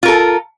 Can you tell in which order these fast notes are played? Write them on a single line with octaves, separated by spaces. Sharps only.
F4 A#4 A4